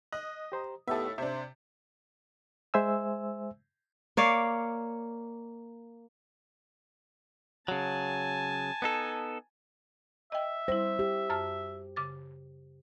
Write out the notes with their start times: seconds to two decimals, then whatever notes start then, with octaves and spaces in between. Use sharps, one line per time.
0.12 D#5 F#6
0.52 G4 C5 A#5
0.88 D#2 A2 B3 G4 A4 E5 D#6
1.18 C3 D4 C5 E5
2.74 G#3 C5 E5 G#5 E6
4.17 A#3 C#5 D5 F5
7.68 C#3 F#3 G#5 A5
8.82 B3 D#4 A4
10.32 D#5 E5 G5
10.68 G3 E4 C5
10.99 G4
11.30 F#2 A5 F6
11.96 C#3 D6 A6